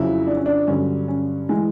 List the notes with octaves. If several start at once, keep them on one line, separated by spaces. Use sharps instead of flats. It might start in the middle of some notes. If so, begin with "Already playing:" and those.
Already playing: F2 C#3 F#3 E4
D4
C#4
D4
G2 D3 F#3 C#4
C#4
E3 G#3